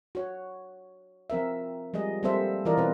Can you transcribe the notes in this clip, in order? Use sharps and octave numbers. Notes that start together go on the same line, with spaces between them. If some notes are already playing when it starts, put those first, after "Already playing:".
F#4 C#5
F3 C4 A#4 E5
F3 G3 G#3 G#4 D#5
G3 A#3 C4 A4 C5 E5
E3 F4 A#4 D5 D#5
B2 C4 B4